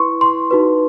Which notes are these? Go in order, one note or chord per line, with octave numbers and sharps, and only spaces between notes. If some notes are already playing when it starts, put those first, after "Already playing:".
Already playing: E4 B4 C6 C#6
C6
D#4 F#4 B4